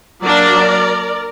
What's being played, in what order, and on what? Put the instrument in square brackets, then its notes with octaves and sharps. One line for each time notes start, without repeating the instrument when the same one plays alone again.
[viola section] F#3 A#3 D4 A#4 D5